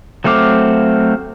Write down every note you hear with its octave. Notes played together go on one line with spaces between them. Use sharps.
F#3 A3 C4 F5 D6